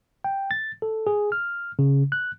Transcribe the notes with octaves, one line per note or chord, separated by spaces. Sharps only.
G5
A6
A4
G#4
F6
C#3
F#6